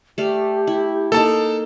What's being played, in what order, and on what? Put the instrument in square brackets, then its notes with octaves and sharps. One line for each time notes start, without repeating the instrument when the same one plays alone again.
[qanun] A3 D5 F5 [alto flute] G4
[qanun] E4
[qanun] A#3 D#4 [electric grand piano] A4 A5